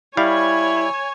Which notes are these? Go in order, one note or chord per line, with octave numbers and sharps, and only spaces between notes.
G3 E4 C#5 F5 G#5